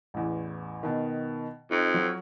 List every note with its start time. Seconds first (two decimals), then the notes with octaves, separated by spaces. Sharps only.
0.14 A1 E2
0.83 B2 D#3
1.71 F2 D#4
1.94 F#3